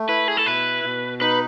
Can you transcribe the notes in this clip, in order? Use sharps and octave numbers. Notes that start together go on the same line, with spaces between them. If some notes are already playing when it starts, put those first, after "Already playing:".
Already playing: A3
E4 B4
G#4
A4
B2 B4
B2
D#4 B4